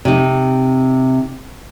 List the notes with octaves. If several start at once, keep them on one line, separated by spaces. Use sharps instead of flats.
C3 D#4